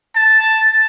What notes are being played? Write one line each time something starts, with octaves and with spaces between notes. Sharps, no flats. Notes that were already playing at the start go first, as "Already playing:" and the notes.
A5